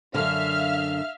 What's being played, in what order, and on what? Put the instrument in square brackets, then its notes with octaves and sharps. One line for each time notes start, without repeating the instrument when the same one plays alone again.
[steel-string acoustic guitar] F#2 D3 [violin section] E5 F5 F6